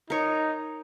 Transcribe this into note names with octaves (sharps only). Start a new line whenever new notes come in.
D#4 A#4 C#5